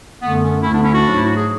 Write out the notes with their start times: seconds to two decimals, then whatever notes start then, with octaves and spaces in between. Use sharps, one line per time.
0.21 F#2 D3 A3 B3
0.43 C#4
0.62 D2 D3 A3 C#4 E4
0.73 B3 D4
0.83 C#4 E4
0.93 D4 F#4
1.04 G#2 F#3 A3
1.16 E4
1.25 F#4
1.36 G#4